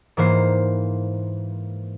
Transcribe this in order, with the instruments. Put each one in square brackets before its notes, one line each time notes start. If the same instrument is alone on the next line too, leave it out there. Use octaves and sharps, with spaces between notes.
[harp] G#2 E3 A#3 C5 C7